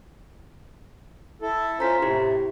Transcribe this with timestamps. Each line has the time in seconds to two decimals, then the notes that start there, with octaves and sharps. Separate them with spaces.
1.42 E4 A4
1.80 C#4 F4 C5 A#5 B6
2.02 A2 C3 E4 G4 C5